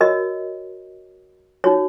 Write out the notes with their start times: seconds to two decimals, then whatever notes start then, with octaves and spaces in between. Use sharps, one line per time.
0.01 F#4 A#4 C#5 D#5
1.64 D#4 F#4 C#5